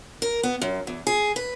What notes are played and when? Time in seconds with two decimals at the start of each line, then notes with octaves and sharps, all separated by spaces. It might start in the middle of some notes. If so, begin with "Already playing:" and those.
0.22 A#4
0.43 B3
0.61 F#2
0.87 E2
1.07 G#4
1.36 B4